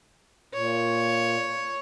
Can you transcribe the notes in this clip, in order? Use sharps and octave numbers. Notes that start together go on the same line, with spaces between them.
A#2 C#5